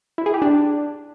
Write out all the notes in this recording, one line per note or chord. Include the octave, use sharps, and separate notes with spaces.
E4
G#4
G4
D4